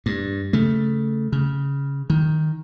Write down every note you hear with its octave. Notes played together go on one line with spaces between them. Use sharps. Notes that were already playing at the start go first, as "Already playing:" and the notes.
G2
C#3 A3
C#3
D#3